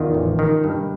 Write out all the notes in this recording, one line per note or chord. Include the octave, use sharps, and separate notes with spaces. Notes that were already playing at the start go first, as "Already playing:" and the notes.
Already playing: E2 D#3 F4
A1
D#3
G2